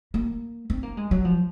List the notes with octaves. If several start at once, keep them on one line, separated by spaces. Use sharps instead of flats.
A#3
C4
A#3
G#3
F#3
F3